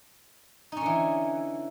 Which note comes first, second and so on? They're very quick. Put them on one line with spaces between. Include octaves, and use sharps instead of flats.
D#4 C#4 D3 E3